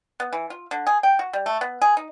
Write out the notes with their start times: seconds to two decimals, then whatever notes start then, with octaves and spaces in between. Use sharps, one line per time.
0.20 B3
0.33 E3
0.50 F4
0.71 D3
0.87 G#4
1.03 G5
1.19 F#4
1.33 G3
1.46 A3
1.61 B3
1.82 G#4
1.97 D#4